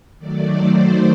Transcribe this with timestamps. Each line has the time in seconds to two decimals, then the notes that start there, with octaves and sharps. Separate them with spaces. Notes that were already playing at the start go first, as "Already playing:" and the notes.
0.18 D#3 F#3 A3 D5
0.53 C5